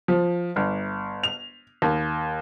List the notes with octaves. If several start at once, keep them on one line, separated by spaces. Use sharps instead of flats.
F3
G1
F7
D#2